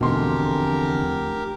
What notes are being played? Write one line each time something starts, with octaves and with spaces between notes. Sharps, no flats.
F1 E2 B2 D3 G4 A#4 C6